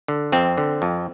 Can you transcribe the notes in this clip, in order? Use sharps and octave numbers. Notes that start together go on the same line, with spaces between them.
D3
F2 C4
D3
F2